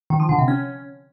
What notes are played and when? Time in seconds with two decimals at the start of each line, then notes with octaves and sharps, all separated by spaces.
0.10 D#3
0.20 F3
0.29 D3
0.38 C3
0.48 C#4